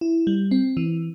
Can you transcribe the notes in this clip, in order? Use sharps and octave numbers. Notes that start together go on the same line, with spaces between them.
E4
G3
C4
E3